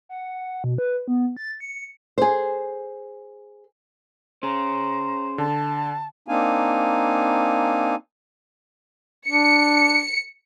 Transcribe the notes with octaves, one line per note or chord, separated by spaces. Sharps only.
F#5
B2
B4
B3
A6
C#7
G#4 C5
C#4 G#4 C5 A#5
D3 A5
A#3 C4 D4 D#4 F5 G#5
D4 C#7